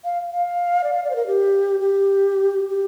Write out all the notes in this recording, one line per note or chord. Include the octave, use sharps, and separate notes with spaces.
F5
F5
D5
F5
D5
C5
A#4
G4
G4
G4